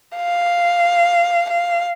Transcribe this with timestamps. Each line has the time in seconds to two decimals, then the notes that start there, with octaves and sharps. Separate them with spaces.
0.17 F5
1.50 F5